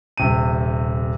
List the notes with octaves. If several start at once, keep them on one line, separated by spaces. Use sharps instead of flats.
D#1 C3 D#7